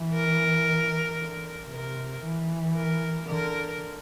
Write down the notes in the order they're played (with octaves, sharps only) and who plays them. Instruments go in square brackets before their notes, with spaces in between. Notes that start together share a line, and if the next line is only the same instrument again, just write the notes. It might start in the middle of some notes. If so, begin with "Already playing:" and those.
Already playing: [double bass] E3
[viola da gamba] A#4
[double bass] D3
[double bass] C3 [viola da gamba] A#4
[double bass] E3
[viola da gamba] A#4
[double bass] D3 [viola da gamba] A#4